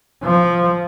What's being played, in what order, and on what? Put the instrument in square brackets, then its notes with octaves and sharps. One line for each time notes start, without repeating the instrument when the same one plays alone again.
[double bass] F3